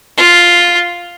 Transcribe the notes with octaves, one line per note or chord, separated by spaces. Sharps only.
F4